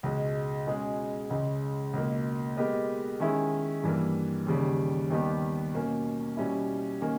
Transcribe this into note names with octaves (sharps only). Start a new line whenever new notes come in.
C#2 B2 G#3
B2 G#3 C#4 G#4
C#2 C#3 G#3
C#2 B2 A#3
G#3 B3 G4 A#4 D#5
D#3 G#3 C#4 E4 G#4
G2 E3 A#3
D#2 C#3 G3
D#2 D#3 G3 B3 G4
B2 A#3 C#4
B2 G3 C#4 E4
D#3 A#3 C#4